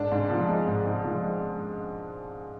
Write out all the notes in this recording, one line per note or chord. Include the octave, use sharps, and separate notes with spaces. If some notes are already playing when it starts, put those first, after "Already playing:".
Already playing: G#2 D4
G#2
F3
G#3
G#2
G#2
F3
G#3